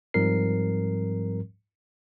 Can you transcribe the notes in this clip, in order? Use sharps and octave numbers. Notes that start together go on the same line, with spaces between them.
G#2 F3 G3 C4 A#4 C7